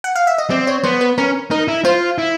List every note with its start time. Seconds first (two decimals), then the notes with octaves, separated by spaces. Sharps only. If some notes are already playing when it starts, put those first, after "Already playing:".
0.04 F#5
0.15 F5
0.27 E5
0.38 D#5
0.50 C4 D5
0.67 C#5
0.84 B3 C5
1.01 B4
1.18 C#4 A#4
1.51 D#4 A#4
1.68 E4
1.85 F4 C5
2.18 E4